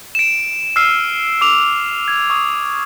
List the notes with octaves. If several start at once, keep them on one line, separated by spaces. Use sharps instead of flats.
D7 E7
E6 F6 C7 D#7
D6 F7
G#6
C#6 D#6